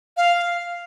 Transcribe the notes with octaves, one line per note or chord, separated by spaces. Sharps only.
F5